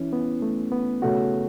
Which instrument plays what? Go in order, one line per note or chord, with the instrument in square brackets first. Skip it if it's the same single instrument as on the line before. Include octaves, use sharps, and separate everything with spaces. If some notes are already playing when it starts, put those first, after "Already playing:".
Already playing: [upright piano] E3 [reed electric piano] C#4 E4
[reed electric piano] B3
A3
B3
[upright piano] C#3 A3 F#4